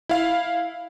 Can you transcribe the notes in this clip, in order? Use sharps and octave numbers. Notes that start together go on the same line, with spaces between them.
E4 F5